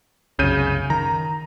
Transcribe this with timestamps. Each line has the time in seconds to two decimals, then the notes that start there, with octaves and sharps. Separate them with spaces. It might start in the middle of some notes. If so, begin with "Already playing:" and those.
0.39 C2 F#2 C#3 G6 D#7
0.90 D#3 A#5